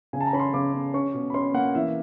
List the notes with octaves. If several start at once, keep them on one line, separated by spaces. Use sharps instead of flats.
C#3 G#5
A5
A#5
C#4 B5
C6
C#3 D6
C#4
C#4 C#6
B2
B5
C#4 C6
A#3 F#5
E3 E5